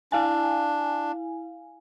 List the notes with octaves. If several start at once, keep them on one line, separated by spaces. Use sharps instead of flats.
D4 E4 F5 G#5